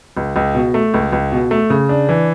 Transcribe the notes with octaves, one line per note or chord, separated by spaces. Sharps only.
C#2
C#2
B2
A3
C#2
C#2
B2
A3
C#3
D4
E3